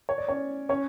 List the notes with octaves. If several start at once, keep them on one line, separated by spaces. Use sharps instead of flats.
C#5
D5
C#4 C#5
C#4 C#5